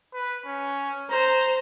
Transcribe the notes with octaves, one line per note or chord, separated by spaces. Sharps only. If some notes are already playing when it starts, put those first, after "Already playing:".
B4
C#4
C5 A#5